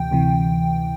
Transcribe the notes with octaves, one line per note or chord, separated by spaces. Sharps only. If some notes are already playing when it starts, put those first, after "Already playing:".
Already playing: D2 C3 E3 G5
D2 C3 E3